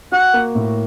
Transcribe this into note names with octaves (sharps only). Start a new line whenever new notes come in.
F#4 F#5
A#3
A2